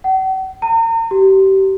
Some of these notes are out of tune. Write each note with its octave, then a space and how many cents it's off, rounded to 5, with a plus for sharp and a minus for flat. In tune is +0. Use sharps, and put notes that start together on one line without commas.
F#5 +45
A#5 -40
G4 -30